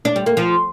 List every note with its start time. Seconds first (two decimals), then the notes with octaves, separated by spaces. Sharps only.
0.05 D4
0.16 G3
0.26 A#3
0.37 F3